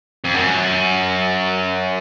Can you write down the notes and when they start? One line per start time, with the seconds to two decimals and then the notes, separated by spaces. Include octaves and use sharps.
0.25 F2
0.34 F#2